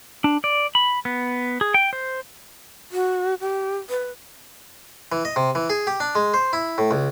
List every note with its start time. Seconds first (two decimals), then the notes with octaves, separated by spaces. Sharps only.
0.24 D4
0.44 D5
0.75 B5
1.05 B3
1.61 G#4
1.74 G5
1.93 C5
2.92 F#4
3.40 G4
3.90 B4
5.12 E3
5.25 D#5
5.36 C3
5.55 E3
5.70 G#4
5.87 G4
6.00 D4
6.15 G#3
6.34 C5
6.53 E4
6.78 A2
6.91 C#2